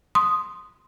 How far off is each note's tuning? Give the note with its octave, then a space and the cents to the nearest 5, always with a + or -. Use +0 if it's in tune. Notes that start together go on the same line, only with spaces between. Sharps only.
C6 +0 D#6 +0